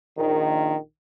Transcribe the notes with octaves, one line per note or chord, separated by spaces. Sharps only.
A#1 D#3